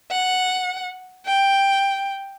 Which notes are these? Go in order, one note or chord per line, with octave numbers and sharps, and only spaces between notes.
F#5
G5